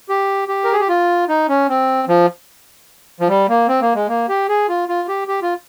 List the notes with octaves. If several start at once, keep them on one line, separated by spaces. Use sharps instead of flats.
G4
G4
A#4
G#4
G4
F4
D#4
C#4
C4
F3
F3
G3
A#3
C4
A#3
G#3
A#3
G4
G#4
F4
F4
G4
G4
F4